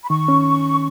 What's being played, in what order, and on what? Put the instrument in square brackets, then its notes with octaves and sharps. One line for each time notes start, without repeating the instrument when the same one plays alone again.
[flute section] B5
[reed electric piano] D#3 [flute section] C#6
[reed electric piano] C#4